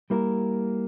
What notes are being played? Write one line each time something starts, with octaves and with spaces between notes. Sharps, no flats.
G3 A#3 E4 A#4